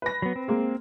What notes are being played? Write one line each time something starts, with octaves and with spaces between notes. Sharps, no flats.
B4 A#6
F#3 B3
C4
G#3 A#3